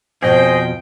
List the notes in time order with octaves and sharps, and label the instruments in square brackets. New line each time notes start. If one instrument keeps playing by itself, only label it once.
[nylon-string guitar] F2 B2 [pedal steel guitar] G#4 D#5 [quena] C5 [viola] G5